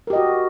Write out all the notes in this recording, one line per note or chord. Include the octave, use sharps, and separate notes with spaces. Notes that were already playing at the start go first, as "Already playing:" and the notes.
F#4 G4 A#4 D#5